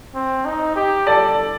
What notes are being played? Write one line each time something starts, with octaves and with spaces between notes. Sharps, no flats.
C4
D#4
G4
A4 D5